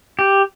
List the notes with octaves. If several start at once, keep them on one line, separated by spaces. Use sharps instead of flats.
G4